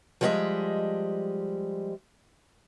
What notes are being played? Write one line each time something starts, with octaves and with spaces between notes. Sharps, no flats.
F3 G3 G#3 G#4 D#5 E5